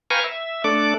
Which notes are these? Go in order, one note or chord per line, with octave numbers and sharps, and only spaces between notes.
B4 F5 G5 G#5 A#5 C#6
E5
A3 D4 A4 D5 D6